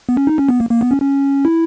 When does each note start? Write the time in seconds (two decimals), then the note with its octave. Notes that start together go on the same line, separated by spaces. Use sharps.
0.09 B3
0.17 C#4
0.27 D#4
0.38 C#4
0.49 B3
0.60 A#3
0.71 A#3
0.81 B3
0.91 C#4
1.02 C#4
1.45 E4